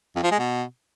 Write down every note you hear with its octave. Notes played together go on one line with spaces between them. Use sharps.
F2
F3
G#3
B2